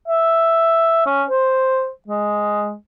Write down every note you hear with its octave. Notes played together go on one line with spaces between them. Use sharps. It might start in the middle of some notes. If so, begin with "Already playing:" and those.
E5
C#4
C5
G#3